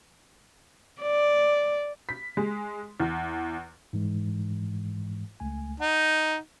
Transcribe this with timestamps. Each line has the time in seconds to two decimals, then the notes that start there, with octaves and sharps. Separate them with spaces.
1.02 D5
2.09 B6
2.37 G#3
3.00 E2
3.93 G#2 E3 G#3
5.40 C#2 A3 G#5
5.80 D#4 F#5